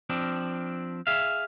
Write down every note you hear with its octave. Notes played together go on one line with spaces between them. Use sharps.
F3 C4 D4
G#4 E5 F5